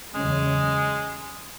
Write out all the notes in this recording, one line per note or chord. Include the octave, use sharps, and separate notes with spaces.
E2 C#3 F#3 G#3 C#4